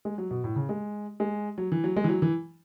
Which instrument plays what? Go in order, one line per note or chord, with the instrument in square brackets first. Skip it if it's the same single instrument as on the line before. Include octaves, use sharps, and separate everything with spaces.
[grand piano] G#3
F#3
B2
A2
C#3
G#3
G#3
F#3
E3
F#3
G#3
E3
F#3
E3